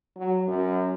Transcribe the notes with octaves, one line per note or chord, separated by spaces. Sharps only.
F#3
F#2